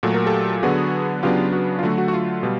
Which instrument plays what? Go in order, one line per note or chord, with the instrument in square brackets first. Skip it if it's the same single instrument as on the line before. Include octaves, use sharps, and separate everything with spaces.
[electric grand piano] A#2 F#3 A3 A4
A#4
G4 A4
D3 F#3 B3 D4 F#4 G#4
C#3 F#3 B3 D4 F4 G4
F#4
F4
D3 F#3 A3 F#4
F#4
F#4
F4
B2 G3